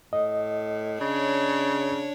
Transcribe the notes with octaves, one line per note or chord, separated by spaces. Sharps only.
A2 D#5
C#3 D4 C#5